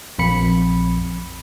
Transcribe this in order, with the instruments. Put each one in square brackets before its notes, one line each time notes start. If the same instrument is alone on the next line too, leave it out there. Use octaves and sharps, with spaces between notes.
[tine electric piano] A#1 F2 B5 C#7